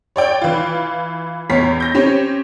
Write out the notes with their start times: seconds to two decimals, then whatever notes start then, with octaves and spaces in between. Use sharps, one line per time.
0.16 C#5 D5 G5
0.41 E3 F4
1.50 E2 C#5 A#5 B6 C7
1.80 G6 A#6
1.94 C4 C#4 G4 C#5